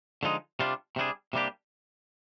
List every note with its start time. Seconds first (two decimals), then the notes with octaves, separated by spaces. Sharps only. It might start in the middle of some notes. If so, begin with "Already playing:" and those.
0.23 D3 F3 G#3 D#4
0.59 C3 G3 D4 F4
0.96 C3 G3 D4 G#4
1.33 C3 G3 A#3 D4 G4